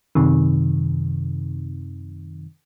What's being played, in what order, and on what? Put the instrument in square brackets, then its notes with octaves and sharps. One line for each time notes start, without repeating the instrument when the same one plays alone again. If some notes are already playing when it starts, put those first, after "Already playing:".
[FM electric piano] F#2 C3 D#3